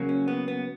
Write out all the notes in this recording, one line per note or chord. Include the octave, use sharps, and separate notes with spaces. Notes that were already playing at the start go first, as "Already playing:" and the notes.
Already playing: C#3 F#3 A#3
C#4
B3
B3